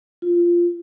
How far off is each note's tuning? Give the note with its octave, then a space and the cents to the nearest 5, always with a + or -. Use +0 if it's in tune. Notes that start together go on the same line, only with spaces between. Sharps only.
F4 -10